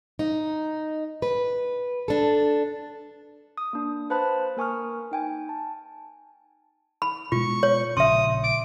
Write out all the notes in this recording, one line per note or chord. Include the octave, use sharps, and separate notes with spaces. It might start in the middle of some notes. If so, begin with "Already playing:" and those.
D#4
B4
D4 A4
D#6
A#3 D4
B4 C5 F5 A5 B5 F#6
A#3 A#4 G#5 C#6 D#6 F6
D#4 G5 G#5
A5
B5
B2 G#3 F4 C#6
C#5
A#1 C#3 E5 C6 D#6
D6